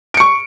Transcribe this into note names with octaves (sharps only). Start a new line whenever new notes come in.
C#6 C#7 D7